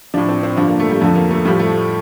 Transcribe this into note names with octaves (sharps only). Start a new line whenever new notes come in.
A2 F3 D4
C4
C4
G2 D3 F3 D4
A#3
A3
G3
F2 D3 F3 A3
A#3
A3
A2 F3 G3
A3